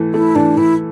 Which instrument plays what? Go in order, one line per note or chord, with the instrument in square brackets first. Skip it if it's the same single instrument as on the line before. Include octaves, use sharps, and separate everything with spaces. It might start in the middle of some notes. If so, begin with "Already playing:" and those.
Already playing: [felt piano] E3 A3
[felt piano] A3 [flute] E4
[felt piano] E3 [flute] D4
[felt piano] E3 [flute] E4